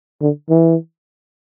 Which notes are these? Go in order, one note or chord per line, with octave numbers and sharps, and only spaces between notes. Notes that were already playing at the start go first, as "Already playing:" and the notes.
D3
E3